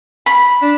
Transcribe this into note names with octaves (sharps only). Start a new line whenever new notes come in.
B5
D4